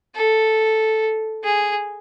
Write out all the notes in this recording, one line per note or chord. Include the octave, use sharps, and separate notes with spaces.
A4
G#4